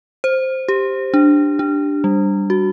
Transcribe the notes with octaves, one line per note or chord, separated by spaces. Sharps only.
C5
G4
D4
D4
G3
F#4